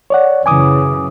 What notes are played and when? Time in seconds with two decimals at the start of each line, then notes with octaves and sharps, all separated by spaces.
0.10 C#5 D5 F#5
0.46 F#2 C#3 E3 G#5 D6 D#6